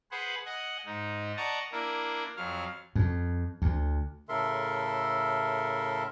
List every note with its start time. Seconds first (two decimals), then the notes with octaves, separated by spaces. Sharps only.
0.11 G#4 B4 C5 F#5
0.46 D#5 F#5 G#5
0.86 G#2 D#4
1.37 D5 D#5 F#5 A5 A#5 C#6
1.72 A#3 D4 E4 A#4
2.36 F2 F#3 F5
2.95 F2
3.62 D2
4.29 A2 C#3 A4 A#4 E5 C6